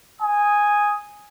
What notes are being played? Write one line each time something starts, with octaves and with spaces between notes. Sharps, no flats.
G#5 D#6